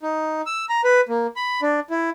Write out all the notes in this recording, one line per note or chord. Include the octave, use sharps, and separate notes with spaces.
D#4
E6
A#5
B4
A#3
B5
D4
E4